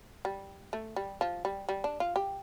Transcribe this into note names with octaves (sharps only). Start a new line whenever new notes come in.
G3
A3
G3
F3
G3
G3
D4
F4
G4